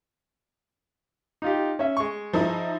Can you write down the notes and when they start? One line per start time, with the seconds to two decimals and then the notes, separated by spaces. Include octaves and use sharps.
1.42 D#4 F4 G4
1.79 C#4 E5
1.97 G#3 C#6
2.33 F3 D#4 E4